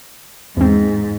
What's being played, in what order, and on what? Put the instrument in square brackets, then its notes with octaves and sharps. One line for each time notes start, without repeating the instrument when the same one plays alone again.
[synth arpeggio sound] E2 C4 [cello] G#2